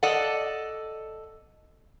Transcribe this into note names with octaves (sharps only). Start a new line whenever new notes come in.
A4 D5 D#5 F#5